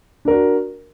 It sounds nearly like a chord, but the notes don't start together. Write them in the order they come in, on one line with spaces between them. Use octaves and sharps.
D4 A#4 F#4